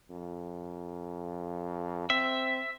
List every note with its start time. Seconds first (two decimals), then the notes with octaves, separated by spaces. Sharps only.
0.11 F2
2.10 C4 E5